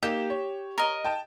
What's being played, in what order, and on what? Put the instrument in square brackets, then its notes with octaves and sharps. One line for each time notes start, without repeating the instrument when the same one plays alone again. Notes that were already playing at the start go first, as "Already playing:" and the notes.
[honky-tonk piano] A#3 D#4 E7 [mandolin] G4
[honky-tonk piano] C#5
[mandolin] A#4 D#5
[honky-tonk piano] G5 A5